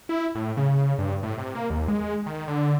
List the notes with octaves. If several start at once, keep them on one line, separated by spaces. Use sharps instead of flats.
E4
A2
C#3
G2
A2
C3
A#3
D#2
G#3
D#3
D3